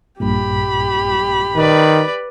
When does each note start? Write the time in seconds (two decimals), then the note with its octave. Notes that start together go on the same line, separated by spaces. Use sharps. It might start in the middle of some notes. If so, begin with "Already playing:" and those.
0.20 A#1 G2 A#2 G4 B5
1.56 D#3 B4 D5